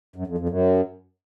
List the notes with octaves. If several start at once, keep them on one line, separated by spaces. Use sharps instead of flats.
F#2
F2
F2
F#2